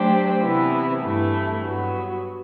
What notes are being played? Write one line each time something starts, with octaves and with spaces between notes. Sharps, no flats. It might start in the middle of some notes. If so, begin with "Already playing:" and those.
Already playing: F#3 A3 D4 G4 C5
C3 E3 B3 E4
G2 E3 A3 E4
G2 F#3 B3 F#4